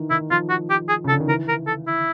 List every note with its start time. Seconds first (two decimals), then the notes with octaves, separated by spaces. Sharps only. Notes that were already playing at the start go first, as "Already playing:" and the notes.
Already playing: D#3 E3
0.10 D#3 E4
0.30 F3 F4
0.49 F#4
0.70 G4
0.88 G#4
1.04 C#3
1.08 A4
1.12 D3
1.20 D#3
1.28 E3 A#4
1.48 A#4
1.67 A4
1.87 E4